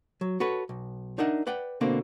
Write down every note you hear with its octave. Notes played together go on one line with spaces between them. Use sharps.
F#3
F#4 A4 B4 C#5
B1
D4 D#4 A#4 E5 F#5
B4 D5 F#5 G5
B2 D3 A#3 C4